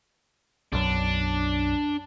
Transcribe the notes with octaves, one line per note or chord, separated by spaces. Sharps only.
B1 F#2 D4